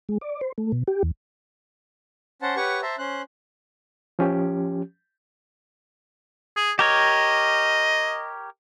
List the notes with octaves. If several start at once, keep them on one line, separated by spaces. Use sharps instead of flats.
G#3
D5
C5
A3
B2
G4
E2
C#4 C5 F#5 A5
G4 B4 C#5 F#5 C#6
C5 E5 A5 A#5
C#4 C5 F#6
F3 C#4 G4
G#4
G4 A#4 C#5 D#5